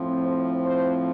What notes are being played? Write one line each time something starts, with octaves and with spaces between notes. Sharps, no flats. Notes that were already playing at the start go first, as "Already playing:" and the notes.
Already playing: A2 F3 C4
C5
C5